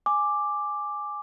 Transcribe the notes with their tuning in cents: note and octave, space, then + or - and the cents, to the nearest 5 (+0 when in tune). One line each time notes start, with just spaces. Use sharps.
G#5 +0 D6 +5